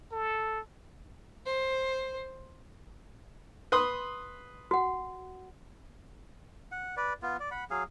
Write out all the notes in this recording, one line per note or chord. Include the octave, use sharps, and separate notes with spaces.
A4
C5
B4 C6 D#6
F#4 F#5
F#5
B4 D5
B3 F4
D5
F#5 B5
F#3 G#4 F5